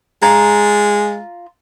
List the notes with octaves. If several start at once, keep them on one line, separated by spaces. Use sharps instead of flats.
G#3 F4 A#5